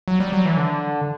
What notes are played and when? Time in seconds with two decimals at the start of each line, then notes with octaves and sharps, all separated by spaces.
0.08 F#3
0.20 G3
0.33 F#3
0.45 E3
0.57 D3